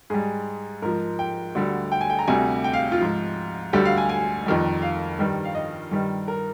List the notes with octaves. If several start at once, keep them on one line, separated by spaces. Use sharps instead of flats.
G#2 G3 G#4
G#2 F3 A#4
G5
D2 D3 G3
G5
G#5
G5
A#5
D2 C3 G3 G#5
G5
F5
F4
G#2 F3
D2 D3 G3 G4
F5
G#5
G#5
F2 D#3 G3
F5
G2 D#3 G3
F5
D#5
G2 D#3 G3
A#4